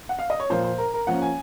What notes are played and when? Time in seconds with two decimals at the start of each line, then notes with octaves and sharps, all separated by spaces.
0.09 F#5
0.19 F5
0.30 D#5
0.40 C#5
0.50 A#2 F3 A#3 C5
0.64 C5
0.78 A#4
0.94 A#4
1.07 F3 A#3 C#4 F#5
1.22 G#5